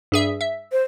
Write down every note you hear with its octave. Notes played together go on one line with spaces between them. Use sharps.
G2 G#4 E5
E5
C5